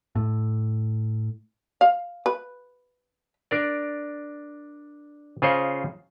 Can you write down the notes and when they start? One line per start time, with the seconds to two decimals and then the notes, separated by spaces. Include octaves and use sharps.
0.15 A2
1.81 F5
2.26 B4
3.51 D4 A#4 D5
5.42 C#3 F4 G#4 C5 C#5 D#5